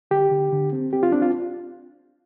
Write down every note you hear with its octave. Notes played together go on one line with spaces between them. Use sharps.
D3 G4
D3
D3
C4
C4 G4
F4
C4 D4
F4